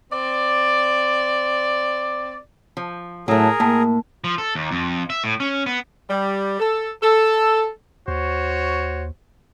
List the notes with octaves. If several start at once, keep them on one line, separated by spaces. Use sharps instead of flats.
C4 D5
F3
A2 F#3 A3 G#4 A#4
A2 A#3
F3
A4
D#2
F2
E5
A2
C#4
B3
G3
A4
A4
D#2 F#4 C5 C#5